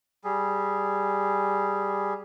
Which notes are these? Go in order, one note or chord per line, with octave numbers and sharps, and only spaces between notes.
G3 G#4